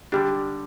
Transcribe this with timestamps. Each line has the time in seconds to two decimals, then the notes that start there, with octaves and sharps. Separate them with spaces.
0.12 D3 G3 D4 G4